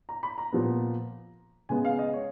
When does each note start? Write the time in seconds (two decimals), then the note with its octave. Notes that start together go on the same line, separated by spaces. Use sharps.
0.09 A#5
0.23 B5
0.38 A#5
0.52 A#2 F3 B3
1.69 C#3 G#3 B3 G#5
1.85 F5
1.99 D#5
2.13 C#5